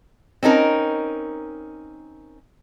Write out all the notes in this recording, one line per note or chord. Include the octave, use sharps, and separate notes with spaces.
C4 C#4 D#4 A#4